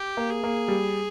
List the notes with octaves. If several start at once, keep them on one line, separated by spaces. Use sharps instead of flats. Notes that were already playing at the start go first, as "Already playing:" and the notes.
Already playing: G4
A#3
G#4
A#3
G3